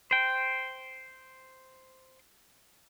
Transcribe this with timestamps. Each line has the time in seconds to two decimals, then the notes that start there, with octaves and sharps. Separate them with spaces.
0.11 C5 G5